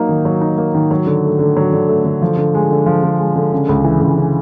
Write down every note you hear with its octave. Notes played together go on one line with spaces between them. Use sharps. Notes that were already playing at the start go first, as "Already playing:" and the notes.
Already playing: F#3 A#3 D#4
D#3
F#3
D#4
A#3
D#3
F#3
D3
A3
D3
F#3
D3
A3
D3
F3
D3
G#3
D3
F3
D3
G#3
D3
C#3
C#2
E3
C#2
C#3